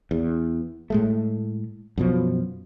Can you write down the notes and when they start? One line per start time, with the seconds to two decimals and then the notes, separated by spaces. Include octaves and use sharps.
0.11 E2
0.90 A2 G#3 A3
1.98 F#2 B2 F3